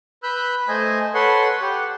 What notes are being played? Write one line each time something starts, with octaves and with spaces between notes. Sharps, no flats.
B4 B5 E6 F#6 G6
A3 C5 D#5 G#5
A4 B4 C#5 F#5 C6
G4 F#5